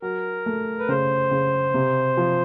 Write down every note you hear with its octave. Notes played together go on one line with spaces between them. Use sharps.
F#3 A#4
A3
B4
C#3 C5
C#3
C3
F3